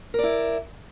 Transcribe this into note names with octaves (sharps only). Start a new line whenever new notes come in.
E4 A#4 D5